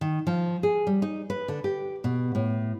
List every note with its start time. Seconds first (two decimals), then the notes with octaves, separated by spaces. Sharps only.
0.01 D#3
0.27 F3
0.63 G#4
0.87 G3
1.02 D#4
1.30 B4
1.48 D3
1.64 G4
2.04 B2
2.35 A2